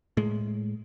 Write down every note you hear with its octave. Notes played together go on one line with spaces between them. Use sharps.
A2 G#3